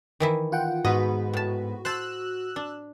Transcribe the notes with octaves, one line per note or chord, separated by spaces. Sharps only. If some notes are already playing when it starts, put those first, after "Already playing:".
D#3 E3 E4
F4 F#5 G5
G#2 B3 F#4 B4 D#5
A2 A5
C5 A5 E6 F#6
D4